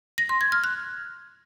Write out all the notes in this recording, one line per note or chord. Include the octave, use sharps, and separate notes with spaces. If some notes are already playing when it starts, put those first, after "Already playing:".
A#6
C6
G#6
F6
F#6